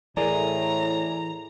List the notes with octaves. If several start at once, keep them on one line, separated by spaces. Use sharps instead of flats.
A2 E3 G#4 A#4 D5 A#5